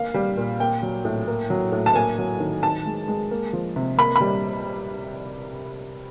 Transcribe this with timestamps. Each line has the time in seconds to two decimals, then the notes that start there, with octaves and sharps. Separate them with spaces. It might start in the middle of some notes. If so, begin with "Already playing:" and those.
Already playing: A#3 F5
0.14 G3
0.37 A#2
0.60 A#3 G5
0.82 F#3
1.05 A2
1.27 A#3
1.50 F#3
1.72 A2
1.86 A5
1.95 A#3 G#5
2.18 F#3
2.40 D#3
2.63 D#3 A5
2.86 G#3
3.08 G#3
3.31 A#3
3.53 F3
3.76 C3
3.98 A#3 B5
4.16 B5
4.21 G3